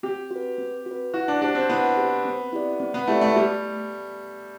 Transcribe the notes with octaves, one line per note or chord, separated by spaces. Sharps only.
C4 G4
F#4 B4
C4
F#4
B4
E4 F#4
D4
D4 G4 C5
C4
B3 E4
G4 C5
C4
E4 G4 D5
C4
B3
A3 E4 G4 D5
A3
G3 A3